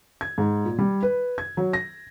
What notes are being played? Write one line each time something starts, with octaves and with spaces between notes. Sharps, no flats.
G#6
G#2
A#2
G3
B4
G#6
F#3
A#6